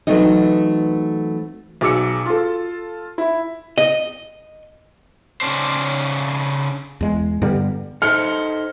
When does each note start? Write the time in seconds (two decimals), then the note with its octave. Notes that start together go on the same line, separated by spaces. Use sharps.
0.07 E3 F#3 A3 C4 D#4 D#5
1.81 B1 G#4 D6 E6 C#7
2.26 F4 A4
3.18 E4
3.78 D#5
5.41 C#3 C#4 D4 C5
7.01 E2 G#3
7.42 G2 D3 G3 B3
8.02 D#4 A4 C5 F6 C#7